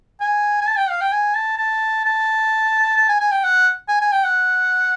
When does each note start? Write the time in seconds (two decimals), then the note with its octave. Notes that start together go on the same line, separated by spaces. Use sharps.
0.20 G#5
0.61 G#5
0.67 A5
0.77 G5
0.89 F5
1.01 G5
1.12 G#5
1.35 A5
1.58 A5
2.05 A5
2.97 A5
3.09 G#5
3.20 G#5
3.31 G5
3.43 F#5
3.88 G#5
4.01 G#5
4.12 G5
4.24 F#5